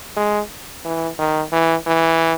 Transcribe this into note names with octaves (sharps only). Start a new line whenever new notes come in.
G#3
E3
D#3
E3
E3